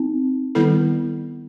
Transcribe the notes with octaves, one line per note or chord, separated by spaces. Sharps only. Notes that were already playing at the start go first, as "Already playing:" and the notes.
Already playing: C4 D#4
D#3 G3 B3 E4 A4